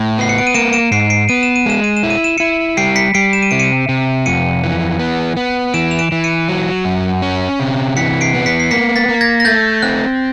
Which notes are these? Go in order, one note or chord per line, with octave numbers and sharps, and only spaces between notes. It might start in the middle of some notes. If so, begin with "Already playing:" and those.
Already playing: A2
B3 C7
C#7
D7
D#7
A#3 D7 E7
D7 E7
G#2 C7 D7
C7 D7
B3 D#7
E7
D#7
G#3 E7
D#7
E7
E4
D#7
E7
E4 C#7 D#7
G3 C7 D7
B6 C#7
G3 C7 D7
E7
D#7
C3 D7
C#7 D#7
C3
F2 C#7 D#7
E3
B3
B3
E3 D7 E7
F7
D7 E7
E3
C#7 D#7
F#3
F#2
C#4
C3
E3 B6 C#7
C7 D7
B3
B6 C#7
C7
A#3 B6 C#7
A6 B6
A#3
G#6 A#6
A#6
A3 G6 A6
C4 F#6